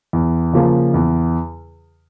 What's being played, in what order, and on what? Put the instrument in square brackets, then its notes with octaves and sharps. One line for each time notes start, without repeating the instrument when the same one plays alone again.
[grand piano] E2
C#3 F3 A#3
E2